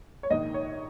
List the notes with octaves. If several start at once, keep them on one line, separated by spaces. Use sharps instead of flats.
C#5
A#1 G#2 D#3 D#5
C#5